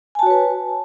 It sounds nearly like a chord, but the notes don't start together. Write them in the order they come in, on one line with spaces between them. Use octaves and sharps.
G#5 A5 F#4 C#5 B4